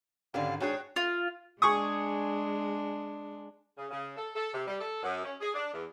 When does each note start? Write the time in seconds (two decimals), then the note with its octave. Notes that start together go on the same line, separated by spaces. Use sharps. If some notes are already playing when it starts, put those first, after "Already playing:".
0.34 G#1 D3 C#4 G4 D5 F5
0.60 G#2 D4 F#4 G#4 C#5 G5 F#6
0.96 F4
1.62 G#3 D4 G#4 C#6 D#6
3.77 C#3
3.91 C#3
4.17 A4
4.35 A4
4.53 C3
4.67 G3
4.80 A4
5.03 F#2
5.24 C#4
5.40 G#4
5.55 D4
5.72 E2